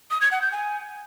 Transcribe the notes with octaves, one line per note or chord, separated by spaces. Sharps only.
D#6
G#6
F#5
G6
G#5